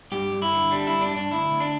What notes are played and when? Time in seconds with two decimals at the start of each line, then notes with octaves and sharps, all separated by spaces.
0.12 G2 G4
0.32 G2
0.42 E4
0.52 D3
0.71 G3 D4
0.87 G2 E4
1.01 D4
1.11 G2 D4
1.31 D2 E4
1.51 D2
1.60 D4